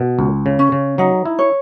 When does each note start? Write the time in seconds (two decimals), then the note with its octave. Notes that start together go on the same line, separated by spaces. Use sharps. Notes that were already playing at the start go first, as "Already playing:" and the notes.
Already playing: B2
0.19 C#2
0.46 C#3
0.59 C#4
0.72 C#3
0.98 F#3 D#4
1.25 E4
1.39 C#5